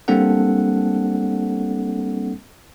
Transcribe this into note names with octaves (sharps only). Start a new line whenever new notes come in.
G3 A#3 C4 D4 A4 F#5